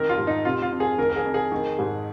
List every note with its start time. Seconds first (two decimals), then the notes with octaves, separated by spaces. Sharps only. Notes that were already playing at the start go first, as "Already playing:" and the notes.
Already playing: F2 D#3 A#4
0.09 F4
0.18 G#2
0.27 D#4
0.45 C3 F4
0.62 F4
0.71 F2
0.80 G#4
0.98 D#3 A#4
1.09 A#4
1.16 G#4
1.25 F2
1.34 G#4
1.52 D#3
1.79 G#2